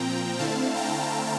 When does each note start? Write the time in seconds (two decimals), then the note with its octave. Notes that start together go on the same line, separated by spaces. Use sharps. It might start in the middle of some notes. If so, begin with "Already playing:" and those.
Already playing: A#2 F3 C4 G5 A#5
0.39 D3 A3 C4 E4 F5 A5
0.76 G5 A#5